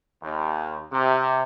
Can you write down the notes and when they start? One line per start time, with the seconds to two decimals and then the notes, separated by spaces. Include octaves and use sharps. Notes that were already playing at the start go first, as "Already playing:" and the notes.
0.23 D#2
0.92 C3